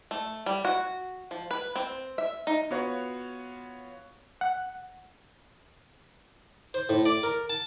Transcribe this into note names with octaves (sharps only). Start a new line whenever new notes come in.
A3
G3
F#4
F3
B4
C4
E5
D#4
B3 F4 F#4 C#5
F#5
C5
A2
D5
A#4
A5